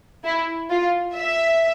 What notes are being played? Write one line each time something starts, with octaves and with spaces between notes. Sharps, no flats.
E4
F4
E5